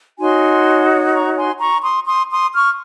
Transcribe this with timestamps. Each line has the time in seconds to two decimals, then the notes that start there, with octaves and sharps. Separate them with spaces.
0.19 D#4 F#4 C#5 G#5 C6
1.13 A#5 C#6
1.36 G#5 C6
1.60 A#5 C#6
1.83 C6 D#6
2.06 C6 D#6
2.30 C6 D#6
2.53 C#6 F6